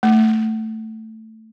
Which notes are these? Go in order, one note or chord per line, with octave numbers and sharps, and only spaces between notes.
A3